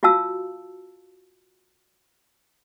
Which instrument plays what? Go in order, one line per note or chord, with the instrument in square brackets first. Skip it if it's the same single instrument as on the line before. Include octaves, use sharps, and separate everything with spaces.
[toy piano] F4 F#4 F5 A5 E6